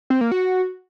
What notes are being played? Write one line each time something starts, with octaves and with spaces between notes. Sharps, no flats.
C4
A#3
F#4